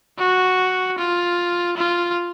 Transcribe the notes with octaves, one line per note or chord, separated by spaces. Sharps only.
F#4
F4
F4